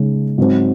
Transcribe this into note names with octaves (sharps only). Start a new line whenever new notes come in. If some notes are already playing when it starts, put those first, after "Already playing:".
Already playing: C#3 G#3 D#4
G#2 F#3 C4